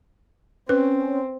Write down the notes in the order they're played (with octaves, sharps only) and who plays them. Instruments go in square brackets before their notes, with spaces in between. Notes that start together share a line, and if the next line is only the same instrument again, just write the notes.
[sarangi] C4 [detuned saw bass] C#4 [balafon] B4